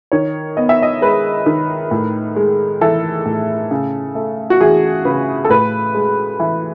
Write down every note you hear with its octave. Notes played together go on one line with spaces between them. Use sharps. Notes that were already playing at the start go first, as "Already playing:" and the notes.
D#3 C#5
B3 D#5
E5
D#5
G#3 B4
D#3
A2
G#3
E3 A4
A2
C#3
A3
F#4
E3 G#4
C#3 B4
A4
A2 B4
G#3
E3